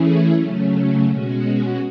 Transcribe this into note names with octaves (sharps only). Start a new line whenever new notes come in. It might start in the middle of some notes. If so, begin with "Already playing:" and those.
Already playing: E3 A3 C#4 E4 G#4
C#3 F#3 A3 C#4
B2 G#3 C#4 F#4